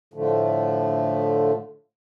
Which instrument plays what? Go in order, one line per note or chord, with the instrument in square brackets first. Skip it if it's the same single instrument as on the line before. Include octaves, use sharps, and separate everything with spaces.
[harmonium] A2 D3 F3 A3